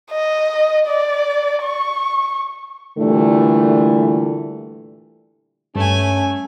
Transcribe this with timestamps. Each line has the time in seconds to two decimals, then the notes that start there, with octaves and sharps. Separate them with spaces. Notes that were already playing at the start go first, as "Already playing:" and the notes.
0.11 D#5
0.87 D5
1.63 C#6
2.98 A#2 D3 E3 G3 A3
5.76 G2 A3 C#4 G#5